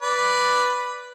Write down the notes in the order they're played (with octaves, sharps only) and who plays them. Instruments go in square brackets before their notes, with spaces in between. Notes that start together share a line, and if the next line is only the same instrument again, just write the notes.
[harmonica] B4 D5